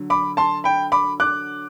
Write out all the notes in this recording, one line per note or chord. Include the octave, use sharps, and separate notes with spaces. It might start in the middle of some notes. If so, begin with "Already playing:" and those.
Already playing: D3 F#3
B5 D6
A5 C6
G5 B5
B5 D6
D6 F#6